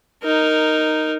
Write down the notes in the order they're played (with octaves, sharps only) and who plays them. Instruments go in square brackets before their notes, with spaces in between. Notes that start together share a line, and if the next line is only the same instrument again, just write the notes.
[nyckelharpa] D#4 A#4